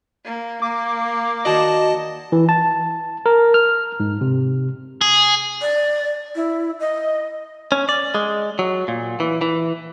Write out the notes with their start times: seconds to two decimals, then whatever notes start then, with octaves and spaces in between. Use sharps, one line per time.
0.25 A#3
0.62 A#3 D6
1.45 D#2 F#4 D5 D#5 A5
2.32 E3
2.49 A5
3.26 A#4
3.54 F6
4.00 G#2
4.21 C3
5.01 G#4
5.61 D5
6.36 E4
6.80 D#5
7.72 C#4
7.89 D5
8.15 G#3
8.59 F#3
8.88 A#2
9.20 E3
9.41 E3